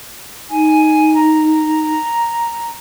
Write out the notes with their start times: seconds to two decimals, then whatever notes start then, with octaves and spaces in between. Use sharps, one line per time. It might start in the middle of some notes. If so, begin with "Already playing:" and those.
0.50 D#4 G#5
1.14 A#5